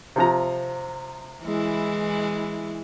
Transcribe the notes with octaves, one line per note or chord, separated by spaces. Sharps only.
C3 F3 A#5
E3 G#3 E4